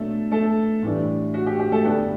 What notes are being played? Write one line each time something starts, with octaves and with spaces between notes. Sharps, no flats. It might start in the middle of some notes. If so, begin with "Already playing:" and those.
Already playing: B2 F#3 A3 D4 A4
A3 A4
A2 E3 G3 D4
F#4
G4
G4
A3 A4
G2 D3 G3 B3 D4 B4